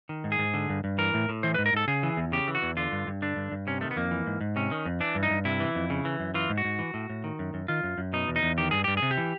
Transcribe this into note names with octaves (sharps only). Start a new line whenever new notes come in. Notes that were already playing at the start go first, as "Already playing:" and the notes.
D#3
G#2
G#4
G#2
D3
G2
G2
E3 A#4
A2
A2
E3 C5
B4
G#2
A#4
G#2 A4
C#3 G#4
E3
E2
C#3 G4
E3
F#4
E2
D3 F4
G2
G2
D3 D4
G2
G2
C3 C#4
D#3 A3
B3
F2 A#3
E3
G#2
G#2
C3 C#4
D#3
F2
E3 D4
G2
D#4
G2
C3 E4
E3
F2
C#3
E3
F#2
E3 F4
G#2
F#4
G#2
E3
A2
A2
D#3
F#2
F#2
D#3 F4
F#2
F#2
B2 D#4
E2
D#4
E2
D#3 G4
G2 G#4
G2 G4
G#4
C3
G4
E3